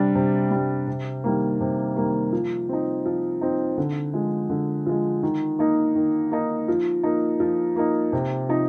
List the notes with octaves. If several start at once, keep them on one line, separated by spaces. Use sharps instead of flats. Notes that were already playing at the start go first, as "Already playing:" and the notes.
Already playing: C3 G3 D4
C3
G3 D4
C3
D#3 G3 A#3
C3
D#3 G3 A#3
F3
C4 D#4
F3
C4 D#4
D3
F3 G#3
D3
F3 G#3
D#3
A#3 D#4
D#3
A#3 D#4
F3
A#3 D#4
F3
A#3 D#4
C3
F3 C4 D#4